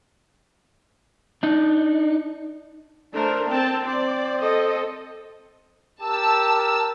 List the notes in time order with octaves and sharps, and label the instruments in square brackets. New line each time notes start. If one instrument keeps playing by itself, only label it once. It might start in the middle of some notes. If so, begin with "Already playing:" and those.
[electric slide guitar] D4 D#4
[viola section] A3 A#4 [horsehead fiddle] D4 C5
[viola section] C4 A5 [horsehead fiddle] G5
[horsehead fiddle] C4 C5 [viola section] D5
[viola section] A4 D#5
[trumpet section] G4 A#4 [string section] A5 E6